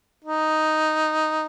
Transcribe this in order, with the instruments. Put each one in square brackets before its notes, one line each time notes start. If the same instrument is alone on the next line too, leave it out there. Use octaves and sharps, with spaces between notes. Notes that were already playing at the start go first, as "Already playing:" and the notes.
[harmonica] D#4